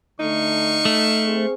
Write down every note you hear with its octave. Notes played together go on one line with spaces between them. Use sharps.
D3 A3 D#4 F5 C#6
A3
C4 G#4 C5